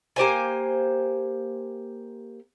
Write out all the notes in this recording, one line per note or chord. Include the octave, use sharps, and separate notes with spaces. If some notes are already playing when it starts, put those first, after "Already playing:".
A#3 G4 C5 G#5